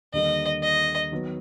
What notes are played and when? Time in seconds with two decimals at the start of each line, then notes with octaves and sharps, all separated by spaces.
0.13 D#2 D3 G3 A#3 D#5
0.62 D#5
1.12 D#3 F#3 B3